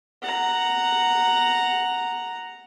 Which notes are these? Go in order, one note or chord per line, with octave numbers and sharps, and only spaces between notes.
F#5 A#5